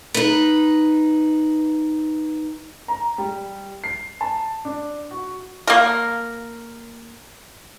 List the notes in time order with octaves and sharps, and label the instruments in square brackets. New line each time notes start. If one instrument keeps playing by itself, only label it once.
[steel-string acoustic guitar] D#4 B4
[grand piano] A#5
G3
C7
A5
D4
F#4
[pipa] A#3 A#4